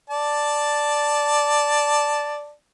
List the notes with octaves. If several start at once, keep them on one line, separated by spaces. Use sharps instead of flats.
D5 A5